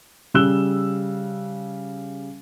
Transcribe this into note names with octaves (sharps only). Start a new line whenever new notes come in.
C#3 G3 E6 F#6 E7 G7